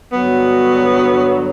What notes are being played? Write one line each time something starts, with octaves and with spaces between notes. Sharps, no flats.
G2 D3 F#3 B3